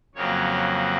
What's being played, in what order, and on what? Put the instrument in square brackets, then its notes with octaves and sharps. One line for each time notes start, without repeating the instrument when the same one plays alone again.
[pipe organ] F2 C#3 F#3 A#3 C#5